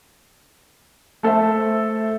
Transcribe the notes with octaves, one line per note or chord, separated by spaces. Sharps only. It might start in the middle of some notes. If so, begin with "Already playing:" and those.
A3 A4 C5 E5